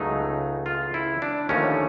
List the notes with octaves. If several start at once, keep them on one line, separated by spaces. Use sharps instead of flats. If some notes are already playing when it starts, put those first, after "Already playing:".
Already playing: C#2 C#3 F#3 A3 D#4
F4
E4
D4
D#2 D3 F3 A3 C#4